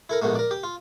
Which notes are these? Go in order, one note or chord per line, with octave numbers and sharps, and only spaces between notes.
E4 A4 A#4
A#1 G#2 B2 A3 A#3
A#4 D5
G4
F4